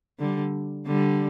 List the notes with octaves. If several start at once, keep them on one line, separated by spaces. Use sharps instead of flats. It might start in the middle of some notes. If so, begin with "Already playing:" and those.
D3 G3
D3 G3